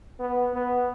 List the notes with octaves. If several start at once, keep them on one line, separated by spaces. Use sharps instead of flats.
B3
B3